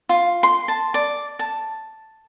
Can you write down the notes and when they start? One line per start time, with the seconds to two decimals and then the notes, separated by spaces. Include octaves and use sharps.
0.09 F4
0.43 C6
0.68 A5
0.94 D5
1.39 A5